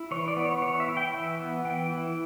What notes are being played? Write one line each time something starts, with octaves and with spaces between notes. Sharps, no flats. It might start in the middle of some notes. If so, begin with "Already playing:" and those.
Already playing: E4
E3 C#5
D5
B3
C#5
E3 C#5
E5
E4
G5
E3 E5
B3
E3 G5
E4